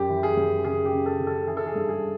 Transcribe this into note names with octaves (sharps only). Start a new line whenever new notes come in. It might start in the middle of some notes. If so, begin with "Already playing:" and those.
Already playing: F#2 G4
E3
G#4
F#2
C#3 G#4
G4
C#3
A4
C#3
A4
E3 G#4
A4
G#4
G2
G#4